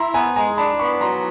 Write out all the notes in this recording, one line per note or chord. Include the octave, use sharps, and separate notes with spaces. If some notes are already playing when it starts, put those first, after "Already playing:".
Already playing: E4 A#5 C6
B3 G#5 A#5
G#3 G#5 A#5
D4 A5 B5
B3 B5 C#6
F#3 A#5 C6